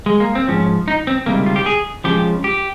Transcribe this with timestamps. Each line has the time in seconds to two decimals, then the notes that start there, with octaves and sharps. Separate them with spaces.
0.06 G#3
0.20 A#3
0.35 C4
0.48 G#2 F3 C#4
0.88 D#4
1.07 C4
1.26 C#2 C3 D#3 G3 A#3
1.46 F4
1.56 G4
1.66 G#4
2.04 C#2 C#3 F3 G4
2.44 G4